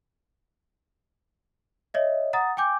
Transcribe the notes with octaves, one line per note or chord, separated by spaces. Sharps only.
C#5 D#5 E5
F#5 A#5 D#6 A6
G5 G#5 D6 G6